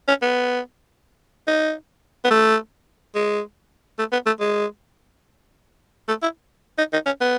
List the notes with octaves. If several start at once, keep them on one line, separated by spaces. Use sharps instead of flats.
C#4
B3
D#4
B3
A3
G#3
A3
B3
A3
G#3
A3
E4
D#4
D#4
C#4
B3